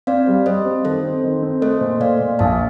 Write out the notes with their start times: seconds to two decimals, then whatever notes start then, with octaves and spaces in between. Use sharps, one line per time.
0.07 C4 D5 F5
0.27 G3
0.46 G3 C5 D#5
0.66 C4
0.85 D#3 A4 C5
1.04 C4
1.24 D#3
1.43 C4
1.62 A3 C5 D#5
1.81 A#2
2.00 A#2 D5 F5
2.20 A#2
2.39 A#1 F5 A5